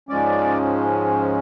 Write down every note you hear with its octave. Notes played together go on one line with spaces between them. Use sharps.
G#2 F3 G#3 C#4 D5